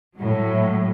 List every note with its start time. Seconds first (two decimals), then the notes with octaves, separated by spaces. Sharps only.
0.17 A2 F#3